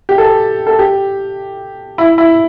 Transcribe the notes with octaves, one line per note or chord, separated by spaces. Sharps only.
G4
A4
A4
G4
E4
E4